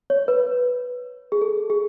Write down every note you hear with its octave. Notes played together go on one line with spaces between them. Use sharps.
C#5
B4
G#4
A4
G#4